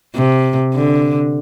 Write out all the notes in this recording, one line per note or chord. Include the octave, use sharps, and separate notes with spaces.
C3
D3